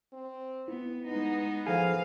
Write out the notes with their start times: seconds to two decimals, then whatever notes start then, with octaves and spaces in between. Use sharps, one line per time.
0.13 C4
0.68 B3 E4
1.06 G#3 B3 D#4
1.66 F3 G#4 A4 C5 F5 G#5